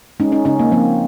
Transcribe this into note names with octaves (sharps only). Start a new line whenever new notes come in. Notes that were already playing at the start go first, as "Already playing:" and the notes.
G#3 C#4 D#4
C#4 D#4
C#3 C#4 D#4
A#3
F3 A#3 C4